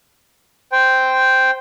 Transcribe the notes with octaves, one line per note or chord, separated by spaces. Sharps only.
C5 G5